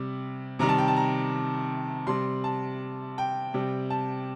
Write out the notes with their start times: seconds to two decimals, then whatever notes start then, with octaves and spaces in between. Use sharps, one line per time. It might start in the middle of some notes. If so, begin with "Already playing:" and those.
Already playing: C3 G3
0.59 C3 D#3 G3 A#5
0.69 A5
0.78 G5
0.88 A5
0.97 A#5
2.07 C3 G3 C6
2.44 A5
3.18 G5
3.54 C3 G3
3.90 A5